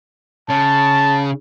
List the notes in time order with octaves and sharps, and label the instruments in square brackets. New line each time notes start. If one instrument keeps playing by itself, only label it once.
[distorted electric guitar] C#3 [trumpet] A5